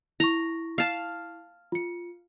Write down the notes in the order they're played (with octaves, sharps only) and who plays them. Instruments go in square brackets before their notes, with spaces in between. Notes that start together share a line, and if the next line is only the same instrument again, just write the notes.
[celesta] E4 C#6 [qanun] A#5
[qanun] F5 A5
[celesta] F4 C#7